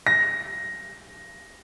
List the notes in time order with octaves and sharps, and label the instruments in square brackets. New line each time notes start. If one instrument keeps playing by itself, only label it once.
[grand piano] A#6